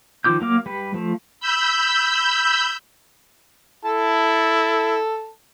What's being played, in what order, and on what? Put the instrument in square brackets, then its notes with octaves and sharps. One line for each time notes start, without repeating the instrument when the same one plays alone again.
[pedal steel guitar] D#3 F3 F4 D6 G6
F#3 A#3 F5 D6
G3 B4
F3 A3
[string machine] B5 E6 G6
[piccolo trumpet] E4 [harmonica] A4 A5